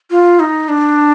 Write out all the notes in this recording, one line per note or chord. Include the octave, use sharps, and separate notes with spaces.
F4
D#4
D4